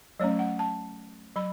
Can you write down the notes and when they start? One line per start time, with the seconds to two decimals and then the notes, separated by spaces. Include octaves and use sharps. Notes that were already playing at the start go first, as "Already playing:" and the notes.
0.20 F#3 A3 C#4 C#5
0.39 F#5
0.59 A5
1.36 F#3 B5